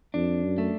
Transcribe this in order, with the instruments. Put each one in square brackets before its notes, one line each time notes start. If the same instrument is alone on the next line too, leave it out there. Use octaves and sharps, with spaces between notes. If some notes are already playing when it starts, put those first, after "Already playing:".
[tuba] F2 [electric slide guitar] D4
[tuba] F#2
[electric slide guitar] A3